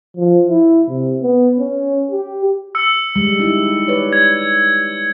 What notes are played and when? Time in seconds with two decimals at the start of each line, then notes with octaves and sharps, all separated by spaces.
0.17 F3
0.48 E4
0.89 C3
1.22 B3
1.59 C#4
2.11 G4
2.75 E6 C#7
3.16 G3 G#3
3.39 D#4 E4
3.88 B4 C#5 D5
4.13 G#6